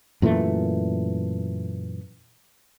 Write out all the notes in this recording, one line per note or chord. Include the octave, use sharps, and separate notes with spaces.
F#2 A#2 E3 A3